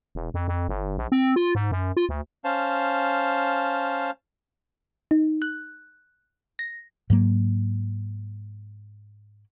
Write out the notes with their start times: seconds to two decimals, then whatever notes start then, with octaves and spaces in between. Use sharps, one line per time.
0.15 E1
0.34 F2
0.48 F2
0.69 G1
0.98 A#1
1.12 C4
1.36 F4
1.55 G#2
1.72 F#2
1.97 F4
2.09 D2
2.44 C#4 C5 F5 A5
5.11 D#4
5.42 F#6
6.59 A#6
7.10 G#2 F#3 A#3